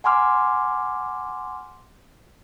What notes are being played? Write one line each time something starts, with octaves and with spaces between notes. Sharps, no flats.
F#5 G#5 A#5 C6 D6 F6